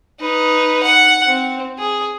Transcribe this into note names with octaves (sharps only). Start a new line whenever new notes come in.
D#4 B4
F#5
C4
G#4